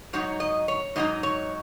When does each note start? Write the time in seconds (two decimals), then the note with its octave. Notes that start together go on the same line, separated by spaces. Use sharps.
0.13 G#2 F#3 D#4 C#5
0.40 D#5
0.68 C#5
0.96 G#2 F#3 D#4 D#5
1.23 C#5